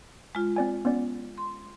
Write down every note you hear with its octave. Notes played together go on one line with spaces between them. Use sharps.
G#3 F4
C4 D5 G#5
B3 C#4 D5
C6